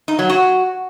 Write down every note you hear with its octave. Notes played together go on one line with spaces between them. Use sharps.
D#4
F#3
F#4